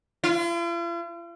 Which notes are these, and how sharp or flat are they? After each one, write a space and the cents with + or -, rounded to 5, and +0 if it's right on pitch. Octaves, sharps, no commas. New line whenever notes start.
F4 -45